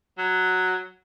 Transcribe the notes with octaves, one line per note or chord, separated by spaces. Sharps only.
F#3